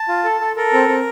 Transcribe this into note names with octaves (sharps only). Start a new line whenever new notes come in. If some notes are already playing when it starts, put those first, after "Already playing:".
Already playing: A5
F4
A4
A4
A4 A#4
C4
C4